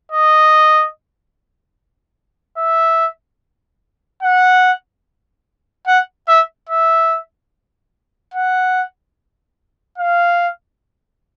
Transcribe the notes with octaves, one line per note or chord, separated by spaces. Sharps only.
D#5
E5
F#5
F#5
E5
E5
F#5
F5